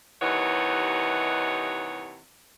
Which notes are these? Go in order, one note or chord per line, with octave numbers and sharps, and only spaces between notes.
D#2 C3 E3 D#4 C#5 F#5